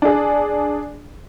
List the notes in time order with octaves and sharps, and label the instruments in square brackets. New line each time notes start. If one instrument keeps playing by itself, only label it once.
[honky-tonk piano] D4 G#4